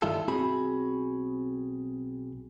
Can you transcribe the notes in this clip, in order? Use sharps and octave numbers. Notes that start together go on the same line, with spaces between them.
G2 D#3 G3 E4 F4 A4
B1 C4 F#4 G#4 B5